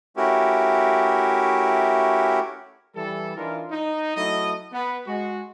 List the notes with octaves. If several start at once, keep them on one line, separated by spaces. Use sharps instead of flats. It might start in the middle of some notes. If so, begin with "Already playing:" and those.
A3 C#4 E4 F#4 G4 A#4
E3 G3 A4
E3 D4 D#4 F4 A#4
D#4
F#3 A3 E4 A4 D#5
B3
G#3 F#4